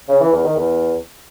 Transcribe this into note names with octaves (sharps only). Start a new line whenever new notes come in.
C#3
E3
E2
D#3
E2